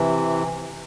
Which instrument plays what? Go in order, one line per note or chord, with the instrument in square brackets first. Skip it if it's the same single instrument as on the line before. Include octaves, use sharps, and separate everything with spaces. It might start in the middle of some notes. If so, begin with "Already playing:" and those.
Already playing: [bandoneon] C3 E3